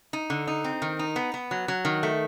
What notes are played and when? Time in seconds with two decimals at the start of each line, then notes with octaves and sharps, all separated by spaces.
0.13 D#4
0.30 D3
0.47 D#4
0.64 C4
0.82 D#3
0.99 D#4
1.16 B3
1.34 B3
1.51 F#3
1.68 F#3
1.85 D#3
2.03 A3